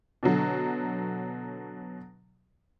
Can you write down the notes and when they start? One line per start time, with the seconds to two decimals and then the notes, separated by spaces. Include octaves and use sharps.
0.23 B2 D3 F#3